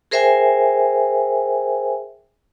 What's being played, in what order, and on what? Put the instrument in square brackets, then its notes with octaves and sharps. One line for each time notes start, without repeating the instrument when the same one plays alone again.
[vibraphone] G#4 A#4 C5 E5 G5 G#5